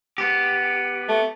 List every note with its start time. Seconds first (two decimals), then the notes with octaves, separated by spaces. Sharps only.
0.18 B3 G4
1.08 A3